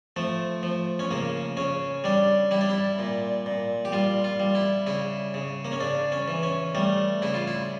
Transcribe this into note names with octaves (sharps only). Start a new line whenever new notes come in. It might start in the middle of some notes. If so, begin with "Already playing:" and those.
F3 A3
F3
C#4
C#3 A#3
C#3 C#4
G3 D4
G3 E4
D4
E4
A#2
A#2
G4
G3 F4
F4
G3
E4
C#3 E4
C#3
A#3
C#4
C#3 D4
C#4
E3
C#4
G3 A3
C#3 E4
F4
E4